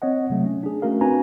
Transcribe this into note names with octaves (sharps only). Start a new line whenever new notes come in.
C4 C#5 D#5 F#5
C3 F#3 A3
C#4
D4 G#4
A3 C#4 F#4 A#4 F5
C4 D4 F#4 B4 G#5 A#5